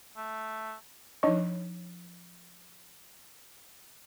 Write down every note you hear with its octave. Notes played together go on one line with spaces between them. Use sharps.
A3
F3 D4 D#4 C#5 D#5 C#6